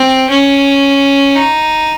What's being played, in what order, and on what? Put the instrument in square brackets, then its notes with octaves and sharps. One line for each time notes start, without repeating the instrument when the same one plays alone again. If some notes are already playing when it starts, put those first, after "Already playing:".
Already playing: [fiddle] C4
C#4
D#4